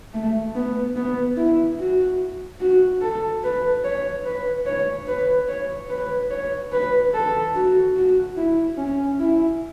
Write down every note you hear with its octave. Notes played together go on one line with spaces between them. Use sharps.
A3
B3
B3
E4
F#4
F#4
A4
B4
C#5
B4
C#5
B4
C#5
B4
C#5
B4
A4
F#4
F#4
E4
C#4
E4